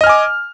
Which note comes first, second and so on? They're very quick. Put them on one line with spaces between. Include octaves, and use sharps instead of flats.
D#5 F6 G#5 D6